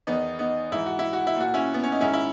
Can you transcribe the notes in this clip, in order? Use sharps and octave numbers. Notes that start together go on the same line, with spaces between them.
E2 D#3 B3 D#4
B3 D#4
G#2 E3 E4
F#4
E4
F#4
E4
A#2 F#4
C#4 E4
B3
C#4
D#4
G#2 D#3 C#4 E4
E4